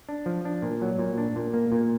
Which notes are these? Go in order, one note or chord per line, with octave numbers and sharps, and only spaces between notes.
D4
F3
D4
A#2
F#3
A#2
D4
A#2
A#3
A#2